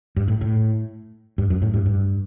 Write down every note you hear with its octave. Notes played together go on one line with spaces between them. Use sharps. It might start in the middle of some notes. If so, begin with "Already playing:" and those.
G2
A2
A2
G2
F#2
A2
G2
G2